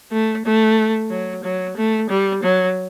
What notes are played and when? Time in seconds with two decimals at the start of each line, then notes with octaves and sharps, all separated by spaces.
0.12 A3
0.45 A3
1.10 F#3
1.44 F#3
1.77 A3
2.10 G3
2.43 F#3